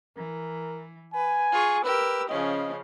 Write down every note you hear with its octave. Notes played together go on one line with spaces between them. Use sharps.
E3 A#4
B4 G#5
F4 G#4 C#6
G4 A#4 B4 E6
C#3 F3 C#4 D#5